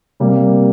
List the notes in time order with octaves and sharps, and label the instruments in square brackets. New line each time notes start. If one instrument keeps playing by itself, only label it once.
[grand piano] C3 G3 A#3